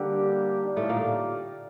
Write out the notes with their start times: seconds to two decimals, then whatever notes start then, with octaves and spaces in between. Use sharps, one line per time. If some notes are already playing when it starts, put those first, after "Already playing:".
Already playing: D3 G3 A#3 D4 G4
0.63 D#4 G4 D5 F5
0.76 A2 A3
0.89 A#2 A#3